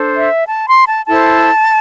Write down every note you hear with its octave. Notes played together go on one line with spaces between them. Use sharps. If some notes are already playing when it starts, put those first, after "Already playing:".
Already playing: D4 A4 C5
E5
A5
C6
A5
E4 A4 C5 A5